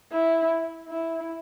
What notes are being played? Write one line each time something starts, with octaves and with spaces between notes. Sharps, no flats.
E4
E4